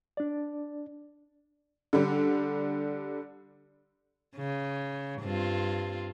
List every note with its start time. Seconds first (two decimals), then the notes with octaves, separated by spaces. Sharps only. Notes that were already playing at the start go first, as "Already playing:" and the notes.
0.17 D4 D5
1.93 D3 G3
4.36 C#3
5.22 G2 C4 F4